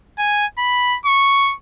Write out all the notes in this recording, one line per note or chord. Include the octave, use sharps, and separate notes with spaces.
G#5
B5
C#6